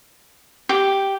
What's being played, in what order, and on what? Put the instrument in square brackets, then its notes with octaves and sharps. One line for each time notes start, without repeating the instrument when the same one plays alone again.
[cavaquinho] G4